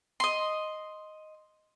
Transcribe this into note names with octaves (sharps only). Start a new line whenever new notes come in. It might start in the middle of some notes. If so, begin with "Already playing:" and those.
D#5 C6